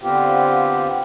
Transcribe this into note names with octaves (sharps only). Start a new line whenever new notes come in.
D3 B3 C4 F4 G4